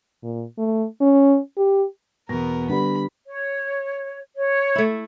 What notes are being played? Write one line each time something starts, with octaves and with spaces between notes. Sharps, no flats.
A#2
A3
C#4
G4
E2 B2 B3 A#4 A#6
D3 G3 B3 B5
C#5
C#5
A3 E4